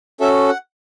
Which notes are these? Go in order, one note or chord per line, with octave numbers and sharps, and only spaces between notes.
C#4 F#4 A4 E5
F#5